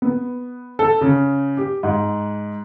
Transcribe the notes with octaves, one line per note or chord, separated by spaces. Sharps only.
B3
A4
C#3
G4
G#2